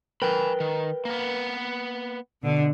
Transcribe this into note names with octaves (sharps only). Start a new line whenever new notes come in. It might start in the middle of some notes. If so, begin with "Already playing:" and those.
A#4 B4 G5 G#5 B5
D#3
A#3 B3
B2 D3